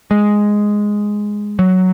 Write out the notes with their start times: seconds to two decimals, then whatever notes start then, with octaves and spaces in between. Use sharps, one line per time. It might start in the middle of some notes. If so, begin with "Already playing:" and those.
0.11 G#3
1.59 F#3